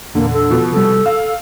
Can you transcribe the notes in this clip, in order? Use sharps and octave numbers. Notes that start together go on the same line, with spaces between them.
E2 A#2 D3 A#3
A4
B2 F3
C3 G3 A4
F5 E6